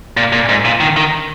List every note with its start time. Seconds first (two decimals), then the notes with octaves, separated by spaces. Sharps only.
0.17 A#2
0.33 A#2
0.49 G#2
0.65 A#2
0.81 D#3
0.97 D#3